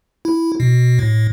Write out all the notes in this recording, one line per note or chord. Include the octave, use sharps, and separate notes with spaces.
E4
B2
A2